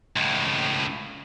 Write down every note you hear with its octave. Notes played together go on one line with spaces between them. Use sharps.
C#2 A2